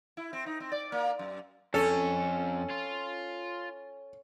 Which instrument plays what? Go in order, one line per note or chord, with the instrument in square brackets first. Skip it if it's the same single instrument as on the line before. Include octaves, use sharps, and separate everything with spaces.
[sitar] E4
C4
D#4
C4
D5
A#3
F#2
[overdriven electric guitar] F2 [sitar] C#4 [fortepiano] A4
[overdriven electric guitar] F4